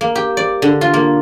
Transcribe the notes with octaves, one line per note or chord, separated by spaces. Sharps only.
A#3
G4
D5
D3
F4
A#3